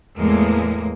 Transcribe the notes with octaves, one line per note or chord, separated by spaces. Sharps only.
E2 A2 G#3 A#3